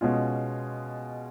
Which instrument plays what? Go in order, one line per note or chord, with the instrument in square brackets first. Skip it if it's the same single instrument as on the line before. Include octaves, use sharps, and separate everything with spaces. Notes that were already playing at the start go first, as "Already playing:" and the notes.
[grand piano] B2 G#3 C#4 F4